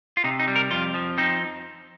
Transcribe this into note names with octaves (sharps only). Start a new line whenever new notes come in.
F4
C3 D#4
D#4
G3
A#4
F2 F4
F3
C4 D#4